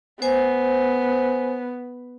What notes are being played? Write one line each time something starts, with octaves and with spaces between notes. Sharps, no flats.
B3 C5 G#5